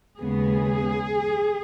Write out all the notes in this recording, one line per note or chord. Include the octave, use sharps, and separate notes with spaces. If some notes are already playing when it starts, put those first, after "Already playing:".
D#2 C#3 G#3 B3 G#4